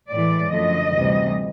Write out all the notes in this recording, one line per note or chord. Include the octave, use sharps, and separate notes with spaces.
A2 E3 G#3 D5
F#2 D3 F3 A3 D#5
D2 C3 E3 G3